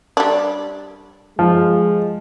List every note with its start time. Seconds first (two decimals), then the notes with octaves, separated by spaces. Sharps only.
0.17 G3 D4
1.39 F3 G#3